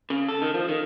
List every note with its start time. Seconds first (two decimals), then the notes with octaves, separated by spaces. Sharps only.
0.10 C#3
0.28 A4
0.42 D#3
0.54 F3
0.69 D#3